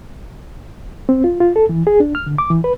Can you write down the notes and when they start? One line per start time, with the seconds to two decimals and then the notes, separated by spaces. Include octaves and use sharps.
1.09 C4
1.24 F4
1.40 F4
1.56 A4
1.69 E3
1.87 G#4
2.00 D4
2.15 F6
2.27 D3
2.38 D6
2.50 E3
2.64 B4